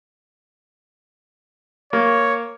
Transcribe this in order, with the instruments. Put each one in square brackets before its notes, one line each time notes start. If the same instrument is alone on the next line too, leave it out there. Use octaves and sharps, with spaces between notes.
[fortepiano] A#3 [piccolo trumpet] C#5